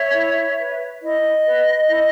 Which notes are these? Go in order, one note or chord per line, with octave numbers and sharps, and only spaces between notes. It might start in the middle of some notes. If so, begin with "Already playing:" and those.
Already playing: C#5 E5
E4
B4
E4 D#5
B4
E4